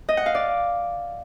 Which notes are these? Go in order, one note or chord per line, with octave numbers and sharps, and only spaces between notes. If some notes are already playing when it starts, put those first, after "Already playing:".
D#5
F#5
F5
D5